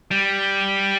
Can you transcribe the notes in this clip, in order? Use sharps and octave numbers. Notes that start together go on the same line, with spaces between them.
G3